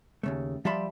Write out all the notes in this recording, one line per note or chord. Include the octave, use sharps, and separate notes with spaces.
D#2 C#3 A3
F3 G3 E5 A5 B5 C6